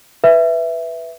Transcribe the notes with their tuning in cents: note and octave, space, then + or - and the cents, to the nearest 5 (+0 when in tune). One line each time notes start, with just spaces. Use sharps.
B4 +0 E5 +0